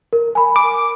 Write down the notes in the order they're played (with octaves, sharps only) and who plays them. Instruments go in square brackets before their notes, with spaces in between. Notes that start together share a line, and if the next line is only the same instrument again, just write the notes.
[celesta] A#4
G#5 B5
[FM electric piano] D6